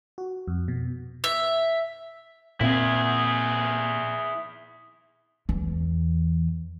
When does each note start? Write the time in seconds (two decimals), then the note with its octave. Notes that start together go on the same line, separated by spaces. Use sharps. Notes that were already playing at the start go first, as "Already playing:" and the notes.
0.18 F#4
0.48 F2
0.68 B2
1.24 E5
2.61 A#2 C4 E4 G#4
5.49 E2